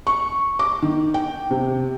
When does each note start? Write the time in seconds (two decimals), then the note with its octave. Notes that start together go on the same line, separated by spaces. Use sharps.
0.07 C#6
0.59 D6
0.82 D#3
1.14 G5
1.51 C3